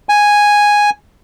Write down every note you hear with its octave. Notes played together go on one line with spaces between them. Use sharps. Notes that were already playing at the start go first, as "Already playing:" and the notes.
G#5